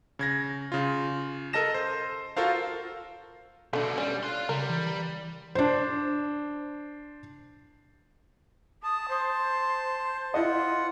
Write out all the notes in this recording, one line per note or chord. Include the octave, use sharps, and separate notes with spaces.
C#3 G#6 A#6
C#3 F4
A4 A#4 D#5 A5 A#6 E7
C5
F4 F#4 A4 A#4 C5 F5
B2 D3 A3 D4
G3 C#4 D5
F5 C6 F#6
C#3 G3 A#4
E3
D4 C5
A5 D#6
C5
E4 F4 D#5 F#5